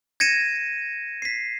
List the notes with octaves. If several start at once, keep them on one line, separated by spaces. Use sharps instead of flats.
G#6 A#6 C#7 D#7 E7
B6 C7